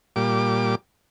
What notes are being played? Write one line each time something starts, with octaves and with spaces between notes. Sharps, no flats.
A#2 G3 D6